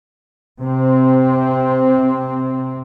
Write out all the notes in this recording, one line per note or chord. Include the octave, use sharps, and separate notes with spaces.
C3 C4